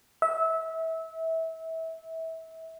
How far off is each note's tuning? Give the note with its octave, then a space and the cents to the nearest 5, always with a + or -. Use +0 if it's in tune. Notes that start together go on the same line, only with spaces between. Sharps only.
E5 -25